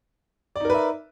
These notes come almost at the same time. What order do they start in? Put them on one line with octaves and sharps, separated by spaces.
D5 D#4 A#4 B4 E5